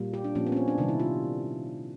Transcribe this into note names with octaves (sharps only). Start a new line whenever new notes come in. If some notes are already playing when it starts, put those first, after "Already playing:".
Already playing: A#2 G3 A#3
G4
D4
A#2 F3 A#3 C#4
B3
C#4
C4
D4
C3 D#3 G3 D#4
E4
F4